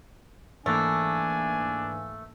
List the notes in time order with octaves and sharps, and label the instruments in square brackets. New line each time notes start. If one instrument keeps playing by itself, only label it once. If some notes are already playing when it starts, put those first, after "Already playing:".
[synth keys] G#2 E3 A#3 [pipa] A3 [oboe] D4 [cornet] G#5